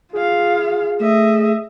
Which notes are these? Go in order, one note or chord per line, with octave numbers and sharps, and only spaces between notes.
F4 G#4 F5
A3 D#5 E5